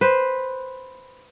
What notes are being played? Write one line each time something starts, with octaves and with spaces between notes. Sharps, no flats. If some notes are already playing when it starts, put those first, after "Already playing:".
B4 C5